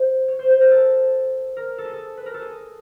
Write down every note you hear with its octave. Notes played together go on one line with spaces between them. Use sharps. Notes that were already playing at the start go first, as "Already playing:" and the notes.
Already playing: C5
C#5
C5
C5
A#4
A4
A#4
A4
G#4
A4
B4
A#4
A4
G#4